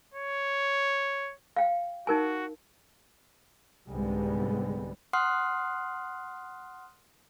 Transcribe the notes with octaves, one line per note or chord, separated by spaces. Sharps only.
C#5
F5 G5
D#4 F#4 A#4 G#5
C2 G#2 D3 G3 G#3 B3
F#5 C6 D#6 F6 F#6 C7